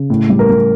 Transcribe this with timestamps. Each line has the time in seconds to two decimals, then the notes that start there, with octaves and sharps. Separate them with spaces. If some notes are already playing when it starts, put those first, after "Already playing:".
Already playing: C#3
0.10 A2
0.29 G3
0.39 A#4
0.49 G3